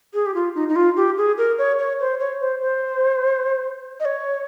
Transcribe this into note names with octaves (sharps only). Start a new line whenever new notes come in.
G#4
G4
F4
D#4
D#4
F4
G4
G#4
A#4
C#5
C#5
C5
C#5
C5
C5
D#5
C#5